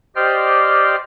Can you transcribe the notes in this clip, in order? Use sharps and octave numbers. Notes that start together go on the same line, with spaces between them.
G4 C5 D5 D#5 G5 F6